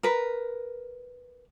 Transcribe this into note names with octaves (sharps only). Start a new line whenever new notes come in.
A#4 B4